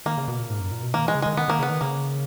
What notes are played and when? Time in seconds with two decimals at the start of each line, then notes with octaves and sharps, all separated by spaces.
0.06 D#3 A#3
0.18 C#3
0.28 B2
0.39 A#2
0.50 G#2
0.61 F#2
0.72 A#2
0.82 B2
0.94 D#3 A#3
1.04 E3 G#3
1.15 C#3
1.22 D#3 G#3
1.37 D#3 B3
1.48 D#3 A#3
1.59 C#3 B3
1.70 D#3
1.81 C#3 A#3